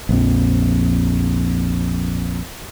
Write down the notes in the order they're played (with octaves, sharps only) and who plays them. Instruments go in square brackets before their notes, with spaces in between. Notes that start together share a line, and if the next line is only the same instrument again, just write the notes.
[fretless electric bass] A#1 F2